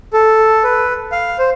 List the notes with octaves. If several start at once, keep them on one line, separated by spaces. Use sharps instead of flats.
A4
B4
F5
C5